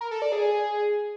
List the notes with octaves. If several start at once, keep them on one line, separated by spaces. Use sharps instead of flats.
A#4
A4
D5
G#4